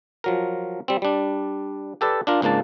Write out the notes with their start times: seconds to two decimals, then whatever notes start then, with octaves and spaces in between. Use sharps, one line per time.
0.24 F3 F#3 A#4
0.88 G3 C4
1.02 G3 D4
2.01 G4 A4 B4 D5
2.27 D4 F4 A#4
2.42 C#2 G#2 A#3 D4 A5